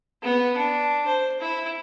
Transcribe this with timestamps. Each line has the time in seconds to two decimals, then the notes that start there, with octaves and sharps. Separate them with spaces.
0.22 B3
0.57 D4
1.07 C5
1.41 E4